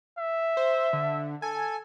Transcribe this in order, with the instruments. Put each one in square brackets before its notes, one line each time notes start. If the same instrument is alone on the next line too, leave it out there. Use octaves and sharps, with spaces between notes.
[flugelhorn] E5
[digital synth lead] C5
D3
[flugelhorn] A4 [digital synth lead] G#5